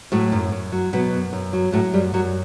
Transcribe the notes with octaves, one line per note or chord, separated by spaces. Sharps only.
A2 F#3 A3
F#2
F#2
F#3
B2 F#3 B3
F#2
F#2
F#3
A2 F#3 A3
F#2 G3
F#2 F#3